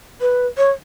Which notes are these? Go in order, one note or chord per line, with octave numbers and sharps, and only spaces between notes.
B4
C#5